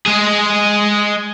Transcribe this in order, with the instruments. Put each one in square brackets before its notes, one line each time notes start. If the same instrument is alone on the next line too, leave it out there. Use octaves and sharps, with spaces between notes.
[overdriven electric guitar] G#3 G#4